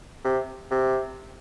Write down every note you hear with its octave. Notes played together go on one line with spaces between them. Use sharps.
C3
C3